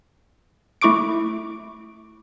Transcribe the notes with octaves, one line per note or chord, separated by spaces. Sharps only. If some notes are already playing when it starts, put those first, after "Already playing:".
A3 E4 C#6 D6 D7